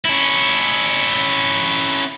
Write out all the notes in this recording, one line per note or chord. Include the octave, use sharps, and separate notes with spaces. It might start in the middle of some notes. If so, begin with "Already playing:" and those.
C#4 E4